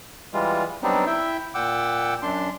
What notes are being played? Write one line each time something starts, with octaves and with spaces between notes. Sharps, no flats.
E3 G3 G#3 F4
F#3 G3 B3 C4 D4 D#4
E4 E5 G5
A#2 F#5 G5 D6 E6
F#2 D4 C6